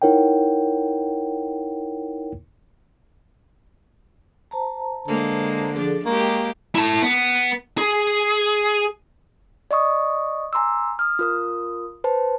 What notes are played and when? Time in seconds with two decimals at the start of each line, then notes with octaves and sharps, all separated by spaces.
0.02 D#4 E4 A#4 C#5 F#5 G5
4.51 C5 A5 A#5
5.08 D3 G#3 A#3
5.75 F3 D4 G#4 A4
6.06 G#3 A#3 G4 A#4 C#6
6.75 E4 A5
7.02 B3
7.78 G#4
9.71 D5 D#5 C#6 D#6
10.53 G#5 A#5 C6 D6 E6
10.99 D#6 F6
11.19 F4 A#4 D#6
12.04 B4 C5 A5